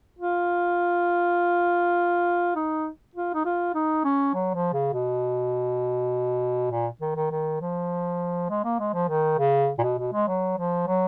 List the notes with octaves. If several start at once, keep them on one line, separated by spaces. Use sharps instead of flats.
F4
D#4
F4
D#4
F4
D#4
C#4
F#3
F3
C#3
B2
A#2
D#3
D#3
D#3
F3
G#3
A#3
G#3
F3
D#3
C#3
A#2
B2
B2
G#3
F#3
F3
F#3